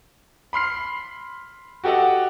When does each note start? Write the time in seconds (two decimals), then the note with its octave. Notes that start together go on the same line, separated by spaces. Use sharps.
0.53 B5 C6 F6 C7
1.84 F#4 G4 A4 D#5 F#5